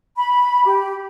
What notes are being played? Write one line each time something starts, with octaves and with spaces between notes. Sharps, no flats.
B5
G4